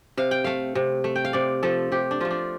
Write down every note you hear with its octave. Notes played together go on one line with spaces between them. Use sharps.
C3 F5
G5
A3 F5
C3
A3
G5
F5
C3 D5
F3 A3 A4
C3 G4
D4
F3 A3 F4
D4